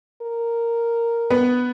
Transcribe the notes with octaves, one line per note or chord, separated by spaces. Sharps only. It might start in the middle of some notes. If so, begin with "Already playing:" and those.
A#4
B3 B4